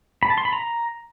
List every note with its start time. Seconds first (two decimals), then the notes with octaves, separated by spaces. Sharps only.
0.23 B5
0.30 A5
0.38 C6
0.45 B5
0.53 A#5